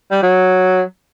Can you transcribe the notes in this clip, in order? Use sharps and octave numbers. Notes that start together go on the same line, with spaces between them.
G3
F#3